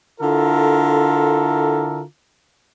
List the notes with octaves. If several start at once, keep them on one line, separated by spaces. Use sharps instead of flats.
D3 E4 F4 A4 A#4